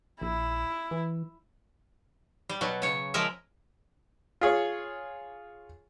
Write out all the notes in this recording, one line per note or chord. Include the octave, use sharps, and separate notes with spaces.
A#1 E4
E3
G3
B2 F#3
C#3 C#5
F3 G#3 A#4 E5
F4 G#4 C#5